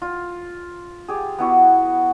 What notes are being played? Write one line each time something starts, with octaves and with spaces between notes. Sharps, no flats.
F4
G4 G#4
B3 E4 F#4